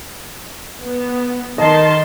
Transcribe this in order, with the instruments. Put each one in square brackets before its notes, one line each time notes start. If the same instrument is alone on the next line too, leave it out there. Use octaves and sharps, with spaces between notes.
[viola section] B3
[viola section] D#3 A5 C6 [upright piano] D#5